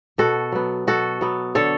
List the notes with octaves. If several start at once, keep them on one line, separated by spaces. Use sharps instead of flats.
B2 F#4 A4
F#3 B3
B2 F#4 A4
F#3 B3
D3 A4 C#5